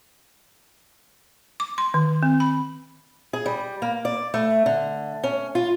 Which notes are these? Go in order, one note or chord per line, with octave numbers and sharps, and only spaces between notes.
D6
C6
D#3
C4
B5
G#4
G3
A#3
D5
A3
D3
C#4
F4